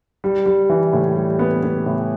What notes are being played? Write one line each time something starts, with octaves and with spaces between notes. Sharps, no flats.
G3
G3
E3
A2
G3
B3
B3
A2